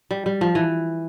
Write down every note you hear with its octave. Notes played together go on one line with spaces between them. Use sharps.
G3
G3
F3
E3